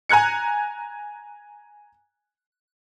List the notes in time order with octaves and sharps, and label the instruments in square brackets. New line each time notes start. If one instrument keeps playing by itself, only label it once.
[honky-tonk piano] G#5 A#5 F#6 G#6 C#7